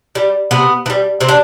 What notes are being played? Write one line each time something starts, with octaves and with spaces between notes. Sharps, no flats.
G3
C3 B3
E3
G3
C3 C4
D4